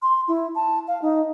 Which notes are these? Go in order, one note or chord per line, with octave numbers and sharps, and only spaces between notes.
C6
E4
A5
F5
D#4